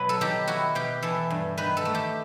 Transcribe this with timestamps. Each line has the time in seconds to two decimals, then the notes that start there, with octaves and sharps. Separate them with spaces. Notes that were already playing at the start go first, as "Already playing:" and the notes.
Already playing: B2 F#3 B4
0.09 A4
0.21 D#3 G4
0.47 E4 F#4
0.75 B2 G4
1.02 E3 A4
1.30 G2
1.58 D#3 B4
1.77 A4
1.85 A3
1.95 G4